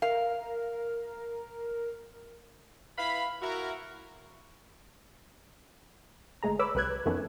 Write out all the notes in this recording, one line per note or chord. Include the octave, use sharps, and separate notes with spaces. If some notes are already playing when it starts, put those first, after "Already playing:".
A#4 F5
E4 B4 F5 B5
E4 F#4 A#4
G1 G#3 A3 G#4 A#5
B4 C#5 B5 D6 E6
C2 G3 B4 F#6 G#6
F2 D#3 E3 A3 B3 C#4